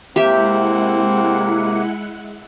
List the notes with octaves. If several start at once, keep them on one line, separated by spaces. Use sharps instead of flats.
C3 G#3 A#3 C4 E4 G4 E5 F#5